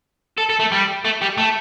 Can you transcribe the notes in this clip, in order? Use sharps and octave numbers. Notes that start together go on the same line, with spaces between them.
A4
A4
A3
G3
A3
G3
A3